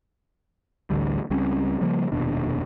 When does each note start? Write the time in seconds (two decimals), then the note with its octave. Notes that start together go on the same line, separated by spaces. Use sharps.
0.90 A1 D2 D3 G3
1.30 C#2 G3 C4 C#4
1.81 C#3 F3 G3 A#3
2.12 F1 D#2 B2 D4